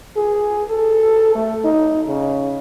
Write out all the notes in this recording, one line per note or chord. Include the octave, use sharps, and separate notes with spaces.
G#4
A4
A3
D#4
C#3